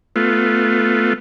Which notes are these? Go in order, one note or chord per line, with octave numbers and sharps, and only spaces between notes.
A3 B3 F4